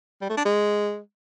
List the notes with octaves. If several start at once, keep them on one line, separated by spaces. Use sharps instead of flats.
G3
A3
D4
G#3